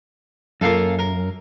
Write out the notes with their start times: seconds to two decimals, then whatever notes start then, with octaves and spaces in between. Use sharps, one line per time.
0.61 F#2 A#3 F4 A4
0.99 A#4